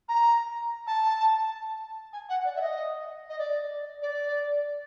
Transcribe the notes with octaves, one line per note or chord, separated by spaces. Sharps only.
A#5
A5
G#5
F#5
D5
E5
D#5
D#5
D5
D5